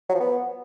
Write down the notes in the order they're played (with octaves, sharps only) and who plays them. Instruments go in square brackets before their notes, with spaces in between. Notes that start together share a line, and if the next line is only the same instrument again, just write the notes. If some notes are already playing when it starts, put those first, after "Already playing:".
[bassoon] F#3
F3
B3